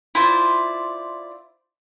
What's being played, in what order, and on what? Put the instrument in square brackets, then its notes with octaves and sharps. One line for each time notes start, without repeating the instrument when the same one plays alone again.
[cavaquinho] E4 F4 C5 D5